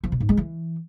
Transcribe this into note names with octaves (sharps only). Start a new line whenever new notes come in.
F3
B2
G#2
G#3
E3